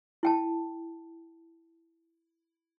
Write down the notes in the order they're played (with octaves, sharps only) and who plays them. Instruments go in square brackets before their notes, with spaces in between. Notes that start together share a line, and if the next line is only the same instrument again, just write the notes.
[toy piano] E4 G5 A5